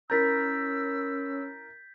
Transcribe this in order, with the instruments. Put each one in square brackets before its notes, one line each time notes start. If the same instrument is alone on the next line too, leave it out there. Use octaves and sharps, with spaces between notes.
[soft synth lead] C#4 [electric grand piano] E4 A#4 A#5 [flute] E6 [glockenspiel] G6 A6 B6